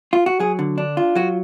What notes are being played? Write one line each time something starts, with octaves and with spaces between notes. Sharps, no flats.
F4
F#4
F#3 G#4
D3
D4
F4
F#3 F#4